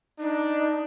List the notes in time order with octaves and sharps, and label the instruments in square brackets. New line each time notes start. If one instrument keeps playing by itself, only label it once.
[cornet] D4 [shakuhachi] D#4